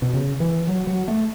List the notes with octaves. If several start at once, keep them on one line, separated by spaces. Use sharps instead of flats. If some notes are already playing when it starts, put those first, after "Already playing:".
B2
C#3
E3
F#3
F#3
A3